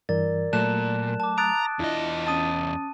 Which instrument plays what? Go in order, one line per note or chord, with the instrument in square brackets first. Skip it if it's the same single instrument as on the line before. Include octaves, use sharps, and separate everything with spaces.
[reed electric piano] G2 E3 [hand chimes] A#4 D5 [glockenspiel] A6
[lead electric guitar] A#2 [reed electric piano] F#3 A3 [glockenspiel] A5 F#6 E7
[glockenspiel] A5 D6
[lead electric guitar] A#5 [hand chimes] D#6 F#6 A6 [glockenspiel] D7
[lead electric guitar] E2 D#5 [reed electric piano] D4 E4 F4
[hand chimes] C#4 D#6 A6 [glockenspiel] A5 D#7